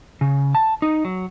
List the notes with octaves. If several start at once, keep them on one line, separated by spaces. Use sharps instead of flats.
C#3
A5
D#4
F#3